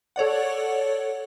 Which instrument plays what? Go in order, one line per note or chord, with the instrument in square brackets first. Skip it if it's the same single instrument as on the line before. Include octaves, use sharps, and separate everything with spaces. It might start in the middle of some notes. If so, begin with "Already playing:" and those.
[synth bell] A4 C#5 D5 F#5